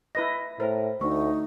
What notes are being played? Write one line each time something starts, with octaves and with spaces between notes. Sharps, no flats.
E4 B4 D#5 A#6
A2 A#4 C5
D2 A3 D#4 C#6